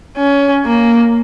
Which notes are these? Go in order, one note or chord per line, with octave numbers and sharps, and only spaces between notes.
C#4
A#3